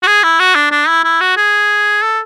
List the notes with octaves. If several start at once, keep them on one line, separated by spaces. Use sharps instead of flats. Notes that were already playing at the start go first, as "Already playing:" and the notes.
F#4
G#4
E4
F#4
D4
D4
E4
E4
F#4
G#4
A4